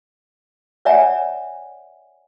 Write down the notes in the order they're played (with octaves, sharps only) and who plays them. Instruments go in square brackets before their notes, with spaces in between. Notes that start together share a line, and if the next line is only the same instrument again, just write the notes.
[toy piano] C#5 D5 E5 F#5 G#5 A#5